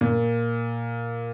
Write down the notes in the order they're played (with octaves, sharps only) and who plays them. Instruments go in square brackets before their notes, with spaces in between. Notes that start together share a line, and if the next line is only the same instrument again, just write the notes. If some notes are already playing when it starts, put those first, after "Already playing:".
[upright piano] A#2